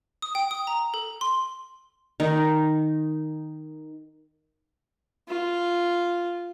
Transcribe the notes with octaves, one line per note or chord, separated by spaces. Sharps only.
D#6
G5
D#6
A#5
A4
C6
D#3 D#4
F4